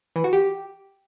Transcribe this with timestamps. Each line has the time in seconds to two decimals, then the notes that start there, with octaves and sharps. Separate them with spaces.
0.16 E3
0.24 F#4
0.33 G4